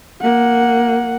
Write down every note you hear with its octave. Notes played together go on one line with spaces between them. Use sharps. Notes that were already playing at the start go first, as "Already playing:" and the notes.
A#3 F#5